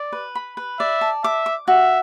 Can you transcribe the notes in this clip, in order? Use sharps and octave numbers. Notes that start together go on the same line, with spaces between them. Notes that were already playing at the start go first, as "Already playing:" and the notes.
Already playing: D5
B4
B5
B4
D5 E5
A5
E5 D6
D6
F#4 E5